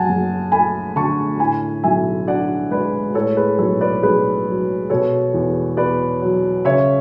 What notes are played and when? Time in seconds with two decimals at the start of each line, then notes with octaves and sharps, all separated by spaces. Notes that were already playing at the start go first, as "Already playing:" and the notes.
Already playing: F#2 F#5 G#5 A5
0.09 F#1
0.52 A3 G#5 B5
0.96 D3 A5 C#6
1.40 A2 G#5 B5
1.83 B1 E5 G#5
2.27 D4 D5 F#5
2.71 G#3 B4 D5
3.15 A2 A4 C#5
3.36 G#4 B4
3.58 B1 A4 C#5
3.81 B4 D5
4.03 B1 G#4 B4
4.47 F#3
4.90 B2 A4 C#5
5.34 E2
5.77 B3 B4 D5
6.22 F#3
6.65 C#3 C#5 E5